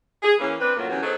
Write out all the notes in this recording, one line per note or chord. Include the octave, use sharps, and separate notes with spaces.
G#4
E3 A#3 C#4
C4 D4 B4
F#2 A2 F#3 A3 A#3 F4
C3 E3 F#3 A#3 B3 C#4
F#3 B3 D#4 G#4 A4 C5